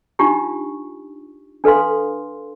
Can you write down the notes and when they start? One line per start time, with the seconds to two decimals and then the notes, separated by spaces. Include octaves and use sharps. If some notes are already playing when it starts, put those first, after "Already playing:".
0.19 D4 D#4 F4 G4 C#6
1.64 D4 A4 B4 F5 C6